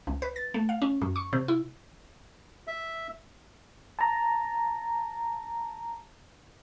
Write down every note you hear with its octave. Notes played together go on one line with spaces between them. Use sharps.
C#2
B4
A6
A3
F5
C#4
F#2
C#6
C3
E4
E5
A5 A#5